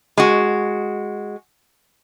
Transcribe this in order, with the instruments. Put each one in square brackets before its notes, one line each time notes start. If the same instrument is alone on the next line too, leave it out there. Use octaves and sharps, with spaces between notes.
[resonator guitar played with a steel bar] G#3 F#4